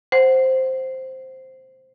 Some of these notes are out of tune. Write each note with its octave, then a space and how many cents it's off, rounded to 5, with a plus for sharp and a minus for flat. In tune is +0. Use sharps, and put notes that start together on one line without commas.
C5 +0 F#5 +10